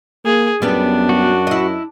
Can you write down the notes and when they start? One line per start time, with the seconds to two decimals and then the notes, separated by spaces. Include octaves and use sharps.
0.25 A#3 G#4
0.62 F#2 G3 B3 D4
1.09 F#4
1.47 E4 D#5